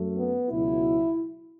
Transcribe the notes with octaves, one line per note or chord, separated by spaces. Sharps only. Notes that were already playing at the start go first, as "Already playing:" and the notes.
Already playing: F#2 F#3 A3
B3
C#2 B2 F#3 E4